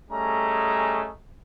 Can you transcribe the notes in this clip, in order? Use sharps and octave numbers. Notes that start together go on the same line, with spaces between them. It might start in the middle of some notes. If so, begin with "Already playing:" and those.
G3 A3 C#4 G#4 D#5 A#5